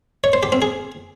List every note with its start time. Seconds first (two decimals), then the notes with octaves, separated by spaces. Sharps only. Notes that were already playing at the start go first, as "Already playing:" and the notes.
0.24 C#5
0.33 C5
0.43 G4
0.52 C4
0.62 G#4